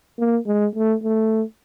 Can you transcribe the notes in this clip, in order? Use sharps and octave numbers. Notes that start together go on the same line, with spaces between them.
A#3
G#3
A3
A3